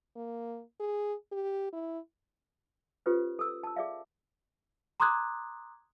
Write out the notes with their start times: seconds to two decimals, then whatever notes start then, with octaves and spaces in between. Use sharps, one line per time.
0.16 A#3
0.80 G#4
1.32 G4
1.73 E4
3.06 C#4 F4 G4 A4 B4 C5
3.39 A4 E6
3.63 A5 E6
3.76 G#4 D5 E5 F5
5.00 A#5 C6 D6 D#6 F#6 G#6